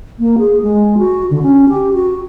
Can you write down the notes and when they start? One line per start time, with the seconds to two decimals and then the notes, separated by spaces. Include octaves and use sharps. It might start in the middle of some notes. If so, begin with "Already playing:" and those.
0.19 A#3
0.38 G#4
0.63 G#3
0.98 F#4
1.30 D3
1.42 C#4
1.69 G4
1.94 F#4